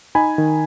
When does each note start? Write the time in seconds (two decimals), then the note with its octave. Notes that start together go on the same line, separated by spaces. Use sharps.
0.15 D#4 G#5 B5
0.38 D#3